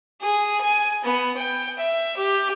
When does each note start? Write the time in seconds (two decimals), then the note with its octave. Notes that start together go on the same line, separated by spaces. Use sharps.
0.21 G#4
0.61 G#5
1.04 B3
1.37 G5
1.79 E5
2.17 G4